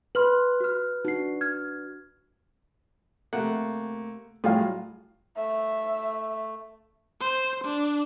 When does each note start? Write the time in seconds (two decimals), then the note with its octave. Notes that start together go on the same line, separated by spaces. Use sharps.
0.15 B4 C6 F6 F#7
0.60 F#4 F6
1.05 D4 D#4 F#4 C7
1.41 F6 G#6
3.33 C3 A3 A#3 F#5
4.44 A2 F#3 G3 F4 G#4 F5
5.37 A3 E5
7.21 C5
7.64 D4